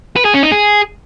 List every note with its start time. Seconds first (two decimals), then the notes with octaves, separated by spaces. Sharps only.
0.16 B4
0.25 G#4
0.34 C#4
0.43 D#4
0.52 G#4